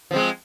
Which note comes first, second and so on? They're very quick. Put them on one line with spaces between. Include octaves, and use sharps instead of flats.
F3 C4 G#3